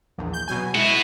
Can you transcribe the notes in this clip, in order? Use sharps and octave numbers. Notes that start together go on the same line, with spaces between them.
A#1 E2
G6
B2 F#3 G#5
G#3 B3 E4 F#4